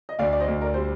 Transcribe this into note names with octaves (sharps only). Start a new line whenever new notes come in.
D#5
D2 D5 F5
D5
C5 D#5
D2
A#4 D5
G3 C5